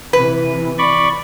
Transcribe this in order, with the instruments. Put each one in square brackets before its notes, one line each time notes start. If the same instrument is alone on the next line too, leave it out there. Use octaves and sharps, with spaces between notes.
[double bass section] C3 E3 [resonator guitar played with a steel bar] B4
[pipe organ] D5 B5 C#6